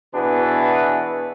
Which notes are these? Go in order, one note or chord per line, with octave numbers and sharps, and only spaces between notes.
B2 E3 D4 F#4 G#4 B4